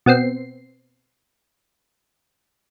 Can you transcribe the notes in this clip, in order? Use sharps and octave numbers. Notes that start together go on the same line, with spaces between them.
B2 B3 C4 C7